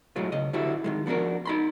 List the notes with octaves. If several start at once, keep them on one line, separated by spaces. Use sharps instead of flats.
B1 A2 F#3 G#3 F4
C#2 D#5
D3 E3 E4 F#4 G4
D#3 E3 G#3
F3 B3 D4 F#4 A#4
D#4 B5 C6